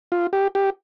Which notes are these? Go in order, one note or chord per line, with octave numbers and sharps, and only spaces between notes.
F4
G4
G4